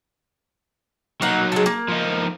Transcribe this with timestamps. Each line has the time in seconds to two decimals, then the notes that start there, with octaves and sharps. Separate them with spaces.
1.22 F#3 A#3 D#4 F#5
1.52 G#3 A4
1.66 A#3
1.89 F3 D#4